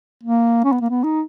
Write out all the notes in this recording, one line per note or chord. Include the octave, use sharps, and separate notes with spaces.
A#3
C#4
B3
A#3
B3
D#4